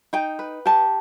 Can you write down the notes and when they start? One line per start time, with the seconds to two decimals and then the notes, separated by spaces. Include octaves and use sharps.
0.13 D#4 G5
0.39 B4
0.66 G4 A5